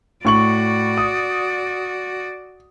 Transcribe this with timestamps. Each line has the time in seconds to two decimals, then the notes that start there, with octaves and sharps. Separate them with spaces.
0.25 A2 F#4 D5 C#6 F#7
0.98 D#6